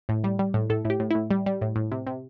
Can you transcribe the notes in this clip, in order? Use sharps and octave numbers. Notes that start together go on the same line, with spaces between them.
A2
G3
G3
A2
A2 A4
A2
G4
A2
A2 E4
G3
G3
A2
A2
C3
C3